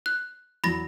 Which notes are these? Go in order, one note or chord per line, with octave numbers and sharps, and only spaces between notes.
F#6
E2 F#3 B5 A6 A#6